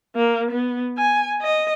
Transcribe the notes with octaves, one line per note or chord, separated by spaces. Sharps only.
A#3
B3
G#5
D#5